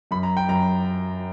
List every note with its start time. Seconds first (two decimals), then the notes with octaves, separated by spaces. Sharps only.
0.11 F#2 B5
0.23 A#5
0.37 G5
0.49 F#2 A#5